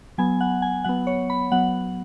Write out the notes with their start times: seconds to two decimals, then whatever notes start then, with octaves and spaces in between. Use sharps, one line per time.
0.18 F#3 B3 G#5
0.41 F#5
0.62 G#5
0.84 F#3 B3 F#5
1.07 C#5
1.30 B5
1.52 F#3 B3 F#5